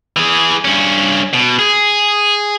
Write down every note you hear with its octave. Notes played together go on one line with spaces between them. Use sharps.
E3 G#4
G2 C#4
B2
G#4